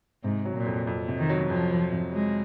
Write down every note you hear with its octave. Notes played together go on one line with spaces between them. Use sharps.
G#2 C3
F#3
A#2
F2
F2
C3
D#3
F#3
F2 F3
F2
C3
F#3 G#3